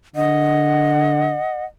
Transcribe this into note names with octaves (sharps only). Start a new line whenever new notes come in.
D3 D#5 F#5